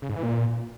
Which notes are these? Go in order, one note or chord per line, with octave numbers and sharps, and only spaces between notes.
C#3
G#2
E3
A#2